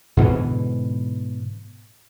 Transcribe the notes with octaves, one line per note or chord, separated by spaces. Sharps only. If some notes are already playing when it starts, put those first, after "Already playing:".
G#2 B2 D3 E3